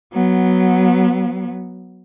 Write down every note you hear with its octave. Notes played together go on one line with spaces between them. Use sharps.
F#3 B3